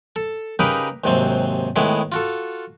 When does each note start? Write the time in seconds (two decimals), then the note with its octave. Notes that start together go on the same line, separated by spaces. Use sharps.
0.16 A4
0.59 C#3 D#4 G4 A#4 B4 D#5
1.04 D#2 G#2 C3 F#3 C4
1.76 A2 D#3 G#3 B3 E4
2.12 F4 F#4 A4